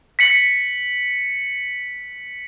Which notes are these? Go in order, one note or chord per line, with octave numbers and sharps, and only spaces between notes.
B6 C#7 F#7